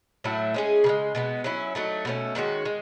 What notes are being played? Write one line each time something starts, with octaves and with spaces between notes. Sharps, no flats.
A2 F#3 A3 E4
G#3 C#4 G#4
C#3 E3 G#3
B2 G#3 B3
F#3 C#4 E4
F#3 A3 D#4
B2 A3 C#4
D#3 G#3 C#4 F#4
G#3